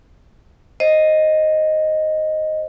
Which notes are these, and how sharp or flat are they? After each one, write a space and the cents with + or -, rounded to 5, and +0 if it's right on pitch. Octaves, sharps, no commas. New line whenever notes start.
C5 +15 D#5 +0